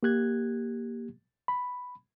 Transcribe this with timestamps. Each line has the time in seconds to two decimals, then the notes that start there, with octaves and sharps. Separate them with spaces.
0.03 A#3 G4 F#6 G#6
1.48 B5